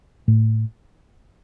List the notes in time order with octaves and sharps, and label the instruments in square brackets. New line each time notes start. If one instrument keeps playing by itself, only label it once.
[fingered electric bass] A2